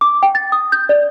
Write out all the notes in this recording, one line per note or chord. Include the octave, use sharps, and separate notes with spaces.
D6
G5
A6
D#6
G6
D5